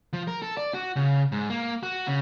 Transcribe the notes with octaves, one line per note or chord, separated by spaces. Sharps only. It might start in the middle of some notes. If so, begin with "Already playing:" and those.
F3
A#4
A4
D5
F#4
C#3
G#2
A#3
F#4
C#3